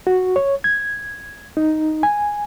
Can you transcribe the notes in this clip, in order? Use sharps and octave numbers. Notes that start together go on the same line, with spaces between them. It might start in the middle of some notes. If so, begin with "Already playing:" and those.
F#4
C#5
G#6
D#4
G#5